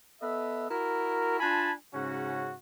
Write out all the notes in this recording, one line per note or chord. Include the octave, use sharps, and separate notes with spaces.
B3 A4 D#5 E5
E4 F#4 A#4
D4 F4 G#5 A5 B5
G#2 C#3 C#4 F#4